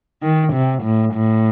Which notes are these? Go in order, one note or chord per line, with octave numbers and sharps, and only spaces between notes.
D#3
C3
A2
A2